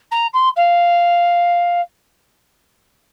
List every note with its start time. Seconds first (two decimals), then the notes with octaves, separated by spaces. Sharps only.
0.11 A#5
0.33 C6
0.56 F5